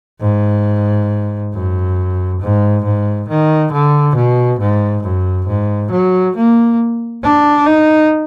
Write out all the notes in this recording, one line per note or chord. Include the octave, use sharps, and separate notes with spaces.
G#2
F#2
G#2
G#2
D#3
D3
B2
G#2
F#2
G#2
F#3
A#3
D4
D#4